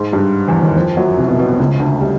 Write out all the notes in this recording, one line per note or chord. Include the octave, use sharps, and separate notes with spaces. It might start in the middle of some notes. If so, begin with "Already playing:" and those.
Already playing: G#2 G#3
G2 G3
E2 E3
D#2 D#3
F2 F3
F#2 F#3
C2 C3
B2
B2
B2
C#2 C#3
D2 D3
G3